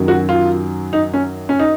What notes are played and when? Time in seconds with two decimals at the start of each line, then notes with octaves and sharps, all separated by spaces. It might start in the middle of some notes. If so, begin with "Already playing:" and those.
Already playing: F#2 D#3 F#3
0.08 F#4
0.29 F4
0.93 D#4
1.14 C#4
1.49 C#4
1.59 D#4